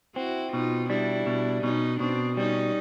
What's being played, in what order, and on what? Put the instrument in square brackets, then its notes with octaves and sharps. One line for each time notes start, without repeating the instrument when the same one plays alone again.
[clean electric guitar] C4 [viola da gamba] E4 F#4
[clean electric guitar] B2 [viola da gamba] D#4 F4
[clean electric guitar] G3 [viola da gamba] D4 E4
[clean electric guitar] B2
[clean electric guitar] B2 [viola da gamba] C#4 D#4
[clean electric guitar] B2 [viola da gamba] C4 D4
[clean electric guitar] G3 [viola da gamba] C#4 D#4